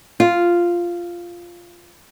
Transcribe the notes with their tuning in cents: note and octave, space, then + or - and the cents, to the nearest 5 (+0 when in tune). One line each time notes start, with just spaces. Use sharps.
F4 -5